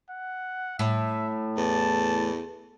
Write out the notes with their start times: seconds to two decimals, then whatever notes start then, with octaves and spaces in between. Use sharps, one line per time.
0.10 F#5
0.79 A2 E5
1.57 E2 A5